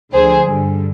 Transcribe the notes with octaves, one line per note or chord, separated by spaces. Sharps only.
D2 D3 F3 G#4 C5
G2 D3 G3